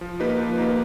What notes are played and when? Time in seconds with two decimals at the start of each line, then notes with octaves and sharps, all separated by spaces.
0.01 F3
0.20 A#3 D#4 G4 B4
0.39 F3
0.58 A#3 D#4 G4 B4